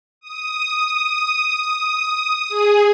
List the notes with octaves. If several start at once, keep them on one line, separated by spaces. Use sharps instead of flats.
D#6
G#4